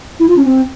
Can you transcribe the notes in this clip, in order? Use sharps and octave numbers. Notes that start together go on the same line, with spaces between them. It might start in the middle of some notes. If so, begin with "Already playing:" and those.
E4
F4
C#4
C4